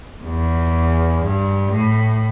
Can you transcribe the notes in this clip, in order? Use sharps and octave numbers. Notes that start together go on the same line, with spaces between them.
E2
G2
A2